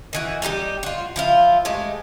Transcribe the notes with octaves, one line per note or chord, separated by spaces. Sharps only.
D#3 E3 F#4
G3 D#4 E4 G4
F4 F#4
F3 E4 F4
C3 G#3 A3